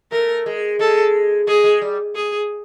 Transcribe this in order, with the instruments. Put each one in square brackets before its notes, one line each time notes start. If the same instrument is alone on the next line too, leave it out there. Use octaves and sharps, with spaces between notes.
[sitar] A3 [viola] A#4
[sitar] G#3
[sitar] G#3 [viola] A4
[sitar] G#3 [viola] G#4
[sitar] G#3
G3
[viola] G#4